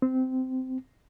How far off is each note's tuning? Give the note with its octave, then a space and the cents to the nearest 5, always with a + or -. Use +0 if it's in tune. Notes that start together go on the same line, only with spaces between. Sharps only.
C4 -15